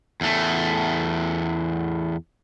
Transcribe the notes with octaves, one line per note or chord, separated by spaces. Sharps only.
E2 A3